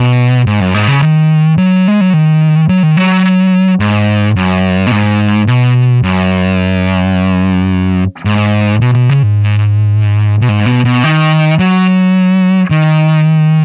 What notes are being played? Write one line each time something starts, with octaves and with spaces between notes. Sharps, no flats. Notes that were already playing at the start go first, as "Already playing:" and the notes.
Already playing: B2
G#2
F#2
G#2
C#3
D#3
F#3
G#3
F#3
D#3
F#3
D#3
F#3
G#2
F#2
B2
G#2
B2
F#2
G#2
B2
B2
C#3
G#2
B2
G#2
B2
B2
D#3
F#3
D#3